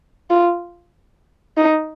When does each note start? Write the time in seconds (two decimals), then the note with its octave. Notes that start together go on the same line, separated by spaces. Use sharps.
0.30 F4
1.57 D#4